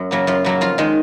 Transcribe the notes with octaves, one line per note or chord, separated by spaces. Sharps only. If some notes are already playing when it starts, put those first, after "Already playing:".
Already playing: F#2
C#3 F#3 A#3
F#2 F4
C#3 F#3 A#3
F2 F4
D#3 G#3